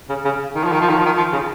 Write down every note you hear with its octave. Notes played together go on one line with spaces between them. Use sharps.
C#3
C#3
D#3
F3
D#3
F3
D#3
F3
D#3
F3
C#3